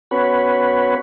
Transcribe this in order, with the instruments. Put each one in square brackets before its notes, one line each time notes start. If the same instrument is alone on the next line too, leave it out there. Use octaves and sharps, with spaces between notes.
[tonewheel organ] B3 C#4 F#4 B4 C#5 B5